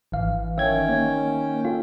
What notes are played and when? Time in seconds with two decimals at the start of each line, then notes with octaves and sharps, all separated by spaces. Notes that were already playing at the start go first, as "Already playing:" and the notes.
0.12 G#1 E3 F5
0.58 D#3 C#4 C#5 E5 G5 G#6
0.89 A#3
1.65 F4 A4